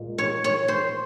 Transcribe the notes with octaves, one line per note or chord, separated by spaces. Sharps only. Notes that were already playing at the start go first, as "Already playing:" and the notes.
Already playing: A#2 G#3
C#5
C#5
C5